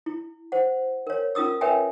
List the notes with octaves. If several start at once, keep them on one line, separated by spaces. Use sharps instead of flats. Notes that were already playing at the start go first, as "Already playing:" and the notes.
E4
C5 F#5
A#4 C#5
C#4 F4 A#4 D#6 E6
A#4 B4 C#5 E5 G5 G#5